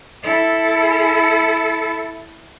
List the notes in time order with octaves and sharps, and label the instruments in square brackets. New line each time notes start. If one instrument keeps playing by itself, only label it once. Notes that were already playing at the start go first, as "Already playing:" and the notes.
[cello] E4 A4